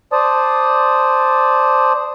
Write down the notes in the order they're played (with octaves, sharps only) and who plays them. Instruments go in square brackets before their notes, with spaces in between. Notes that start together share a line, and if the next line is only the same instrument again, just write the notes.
[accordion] C5 D5 A5 D#6